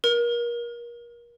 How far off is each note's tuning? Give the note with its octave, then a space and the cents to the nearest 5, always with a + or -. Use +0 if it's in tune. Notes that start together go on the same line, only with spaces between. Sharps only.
A#4 +30